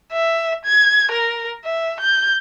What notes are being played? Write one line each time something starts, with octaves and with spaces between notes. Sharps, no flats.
E5
G#6
A#4
E5
G6